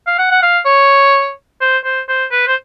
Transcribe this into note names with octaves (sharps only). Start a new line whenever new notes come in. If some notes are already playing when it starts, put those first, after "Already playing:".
F5
F#5
F#5
F5
C#5
C5
C5
C5
B4
C5